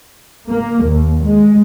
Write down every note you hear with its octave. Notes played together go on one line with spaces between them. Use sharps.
A#3
D#2
G#3